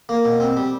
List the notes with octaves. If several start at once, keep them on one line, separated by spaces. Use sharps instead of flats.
A#3
B2
C4
G3